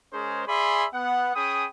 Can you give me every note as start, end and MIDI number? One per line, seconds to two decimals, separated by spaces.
0.13 0.43 56
0.13 0.43 61
0.13 0.43 68
0.13 0.43 70
0.13 0.43 72
0.47 0.86 68
0.47 0.86 74
0.47 0.86 76
0.47 0.86 80
0.47 0.86 83
0.47 0.86 84
0.94 1.34 59
0.94 1.34 78
1.35 1.67 61
1.35 1.67 68
1.35 1.67 79
1.35 1.67 83
1.35 1.67 87